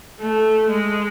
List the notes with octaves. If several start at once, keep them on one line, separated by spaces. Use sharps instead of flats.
A3
G#3